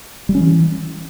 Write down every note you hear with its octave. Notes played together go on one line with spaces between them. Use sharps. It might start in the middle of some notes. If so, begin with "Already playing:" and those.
G3
C#4
E3